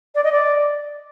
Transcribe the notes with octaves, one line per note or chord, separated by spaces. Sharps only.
D5
D#5
D5